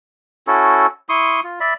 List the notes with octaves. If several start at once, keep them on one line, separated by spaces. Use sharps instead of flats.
C#4 E4 F#4 A4
E4 C6 C#6 D#6
F4
D5 E5 B5